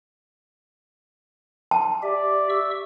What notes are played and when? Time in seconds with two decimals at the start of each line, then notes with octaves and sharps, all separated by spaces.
1.71 A5
2.03 G4 D5 E5
2.50 E5 C#6 E6